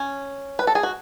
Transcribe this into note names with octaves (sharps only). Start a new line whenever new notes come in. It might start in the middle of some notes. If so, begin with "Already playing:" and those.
Already playing: C#4
B4
A4
G#4
F#4